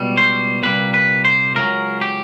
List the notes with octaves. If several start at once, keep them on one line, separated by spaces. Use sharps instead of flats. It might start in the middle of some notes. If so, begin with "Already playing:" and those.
Already playing: C#2 B2 G3
C5
C2 A#2 G3 B4
B4
C5
C#2 C#3 F#3 A#4
G4